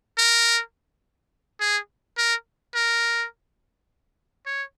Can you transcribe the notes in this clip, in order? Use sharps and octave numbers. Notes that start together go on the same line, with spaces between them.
A#4
G#4
A#4
A#4
C#5